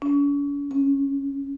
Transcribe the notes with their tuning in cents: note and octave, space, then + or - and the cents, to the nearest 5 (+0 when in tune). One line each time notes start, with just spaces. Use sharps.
C#4 +45
C#4 -5